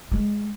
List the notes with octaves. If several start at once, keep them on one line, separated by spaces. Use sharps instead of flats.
G#3